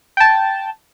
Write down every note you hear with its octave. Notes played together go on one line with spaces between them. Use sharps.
G5 A5